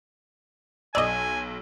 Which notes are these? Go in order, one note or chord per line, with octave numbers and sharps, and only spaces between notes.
B1 D5 D#5 G#5 E6